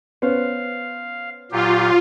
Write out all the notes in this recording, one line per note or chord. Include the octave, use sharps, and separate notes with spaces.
B3 C#4 C5 F5
A#2 F#3 F4 G4